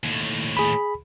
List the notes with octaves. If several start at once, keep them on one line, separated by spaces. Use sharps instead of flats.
D#2 A2
G#4 B5